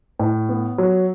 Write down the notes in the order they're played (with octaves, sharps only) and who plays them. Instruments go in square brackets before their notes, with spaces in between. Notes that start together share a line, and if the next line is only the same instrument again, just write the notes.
[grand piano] A2
B3
F#3